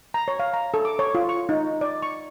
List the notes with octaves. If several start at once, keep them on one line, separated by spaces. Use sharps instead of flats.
A#5
C#5
F5
A#5
A4
D6
C#5
F4
C#6
D#4
D5
C#6